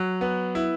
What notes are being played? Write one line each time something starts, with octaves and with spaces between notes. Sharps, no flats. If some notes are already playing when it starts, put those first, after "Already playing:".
Already playing: F#3
B3
E4